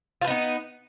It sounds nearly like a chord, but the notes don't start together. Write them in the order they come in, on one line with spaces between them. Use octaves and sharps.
F4 B4 D#4 B3